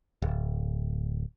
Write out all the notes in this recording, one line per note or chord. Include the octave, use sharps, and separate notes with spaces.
D1